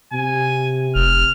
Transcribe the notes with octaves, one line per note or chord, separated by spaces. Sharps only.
C3 G#5
F1 F6